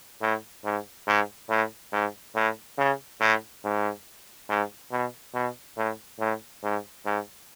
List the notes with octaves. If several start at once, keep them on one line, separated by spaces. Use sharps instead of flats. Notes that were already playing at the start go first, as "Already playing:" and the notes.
A2
G#2
G#2
A2
G#2
A2
C#3
A2
G#2
G#2
B2
B2
A2
A2
G#2
G#2